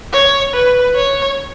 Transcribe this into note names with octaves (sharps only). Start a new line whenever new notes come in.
C#5
B4
C#5